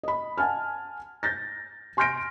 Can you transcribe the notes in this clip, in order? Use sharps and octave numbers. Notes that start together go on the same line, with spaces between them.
D#5 B5
F#5 G#5 A5 F6
G6 A6 A#6
G#5 C6 F6 G6 A#6 D7